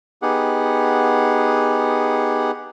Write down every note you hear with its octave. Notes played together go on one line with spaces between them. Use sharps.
B3 D#4 G4 G#4 F#5